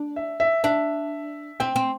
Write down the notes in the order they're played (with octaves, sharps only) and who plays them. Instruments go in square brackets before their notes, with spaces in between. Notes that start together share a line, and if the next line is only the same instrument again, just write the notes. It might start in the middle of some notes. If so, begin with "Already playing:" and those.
Already playing: [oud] D4
[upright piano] E5
E5
[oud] D4 [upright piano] E5
[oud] C4 [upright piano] G5
[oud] C4